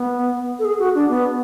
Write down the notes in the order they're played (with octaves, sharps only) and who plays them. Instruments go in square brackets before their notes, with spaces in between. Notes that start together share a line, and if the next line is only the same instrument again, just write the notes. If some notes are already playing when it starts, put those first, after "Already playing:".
Already playing: [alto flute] B3
A4
G#4
F#4
D4
B3